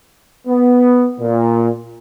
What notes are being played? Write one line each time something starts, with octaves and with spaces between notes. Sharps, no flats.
B3
A#2